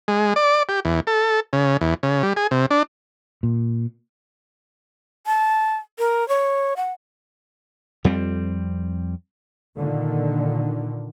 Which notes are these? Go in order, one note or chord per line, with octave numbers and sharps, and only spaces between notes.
G#3
D5
G4
E2
A4
C#3
E2
C#3
G3
G#4
C3
D4
A#2
A5
A#4
C#5
F#5
F2 G3 C4
A#2 D3 D#3